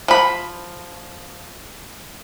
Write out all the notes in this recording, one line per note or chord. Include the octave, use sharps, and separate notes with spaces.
F3 B5